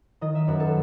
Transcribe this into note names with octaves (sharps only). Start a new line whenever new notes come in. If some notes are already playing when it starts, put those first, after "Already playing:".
D#3 D#5
E5
F#2 B4
A4